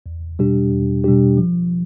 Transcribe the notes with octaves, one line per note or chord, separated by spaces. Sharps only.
E2
B2 G3 D4 G4
E2
B2 G3 D4 G4
F3